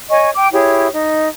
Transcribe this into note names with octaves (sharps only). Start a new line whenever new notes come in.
C#5 D#5 G#5 C#6
G5 D6
E4 G4 G#4 C#5
D#4